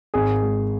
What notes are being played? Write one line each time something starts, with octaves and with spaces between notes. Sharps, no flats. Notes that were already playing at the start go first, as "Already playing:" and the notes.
G#1 G#4
G#3